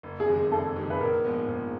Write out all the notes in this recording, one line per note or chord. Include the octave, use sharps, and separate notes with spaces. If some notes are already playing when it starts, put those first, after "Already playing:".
F#1
G#4
F2 C3 D#3 G#3
F#1 A4
F2 C3 D#3 G#3
B4
A#1 A#4
G#2 F3 G#3 B3
A#1